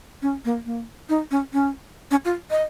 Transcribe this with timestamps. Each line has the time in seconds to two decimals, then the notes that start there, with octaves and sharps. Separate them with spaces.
0.22 C#4
0.45 A#3
0.65 A#3
1.09 D#4
1.31 C#4
1.53 C#4
2.11 C#4
2.25 F4
2.50 D#5